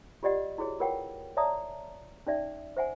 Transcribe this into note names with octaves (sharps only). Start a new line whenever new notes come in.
F4 G4 D5 D#5 F#5
E4 F#4 G#4 C#5
F4 A#4 B4 C#5 F#5 G5
C#5 D5 E5 A5 A#5 D#6
C#4 D#4 D5 E5
C5 E5 F#5 G#5